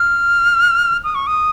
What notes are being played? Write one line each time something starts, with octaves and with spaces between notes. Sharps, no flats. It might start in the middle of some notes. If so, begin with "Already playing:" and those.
Already playing: F6
D#6
C#6
D#6